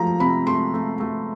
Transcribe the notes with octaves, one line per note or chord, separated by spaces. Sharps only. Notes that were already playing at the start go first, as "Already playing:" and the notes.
Already playing: F3 A3 A#5
C3 B5
A3 C6
A3
A3